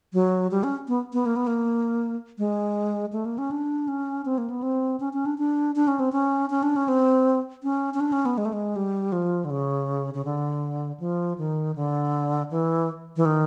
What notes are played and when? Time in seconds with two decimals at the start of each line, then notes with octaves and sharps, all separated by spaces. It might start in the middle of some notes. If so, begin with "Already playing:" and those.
0.13 F#3
0.51 G3
0.64 C#4
0.88 B3
1.13 B3
1.26 A#3
1.36 B3
1.47 A#3
2.38 G#3
3.13 A3
3.25 A#3
3.38 C#4
3.51 D4
3.88 C#4
4.25 C4
4.38 A#3
4.50 B3
4.63 C4
5.00 C#4
5.13 C#4
5.26 D4
5.38 D4
5.76 D4
5.88 C#4
6.00 C4
6.12 C#4
6.50 C#4
6.63 D4
6.76 C#4
6.88 C4
7.63 C#4
7.94 C#4
8.00 D4
8.12 C#4
8.26 B3
8.38 G#3
8.45 A3
8.53 G#3
8.76 G3
9.12 F3
9.45 D3
9.50 C#3
10.14 C#3
10.25 D3
11.00 F3
11.38 D#3
11.76 D3
12.51 E3
13.17 E3
13.25 D#3